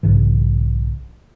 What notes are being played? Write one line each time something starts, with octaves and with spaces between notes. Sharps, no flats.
B1 G#2 C#3 E3